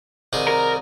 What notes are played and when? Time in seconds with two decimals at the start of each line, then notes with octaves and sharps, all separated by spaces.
0.33 C2 D#3 G#4
0.48 A#4